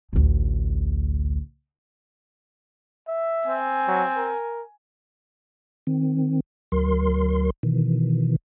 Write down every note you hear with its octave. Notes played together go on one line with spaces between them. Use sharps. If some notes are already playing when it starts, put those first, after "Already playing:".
A1 D2
E5
C4 G#5
F#3
A#4
D#3 C4
D2 F#3 A#4 C6
B2 D#3 E3